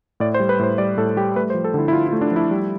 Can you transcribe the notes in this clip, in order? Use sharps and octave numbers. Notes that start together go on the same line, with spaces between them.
A2 D5
C5
G3
B4
A2 C5
G3 D5
A2 A4
G3 G4
A3 B4
C5
F3
A4
D3 E4
E4
D3 F4
E4
A3
D4
F3 E4
G3